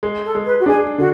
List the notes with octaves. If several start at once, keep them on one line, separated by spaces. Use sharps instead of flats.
G#3
A4
G#3
B4
F#4
D4 G#4
D3 F#4